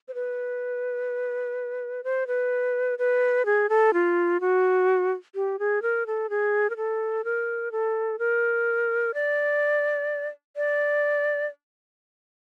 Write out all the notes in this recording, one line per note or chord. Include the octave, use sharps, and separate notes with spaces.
C5
B4
C5
B4
B4
G#4
A4
F4
F#4
G4
G#4
A#4
A4
G#4
A#4
A4
A#4
A4
A#4
D5
D5